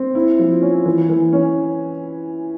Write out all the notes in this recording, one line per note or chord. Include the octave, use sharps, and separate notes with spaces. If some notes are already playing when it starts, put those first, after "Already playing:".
Already playing: C4
E4
F3
C#4
E3
E3
C#4